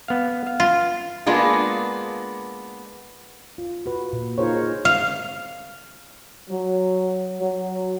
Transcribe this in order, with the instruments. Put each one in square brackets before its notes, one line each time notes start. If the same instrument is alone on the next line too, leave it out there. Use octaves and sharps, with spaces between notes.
[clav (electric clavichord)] B3 F5
F5
[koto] F4
[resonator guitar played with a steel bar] G#3 A#3 B3 D4 F4
[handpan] F4
F#4 B4
A#2
D#4 F4 G#4 A#4 C5 C#5
[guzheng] F5
[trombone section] F#3
F#3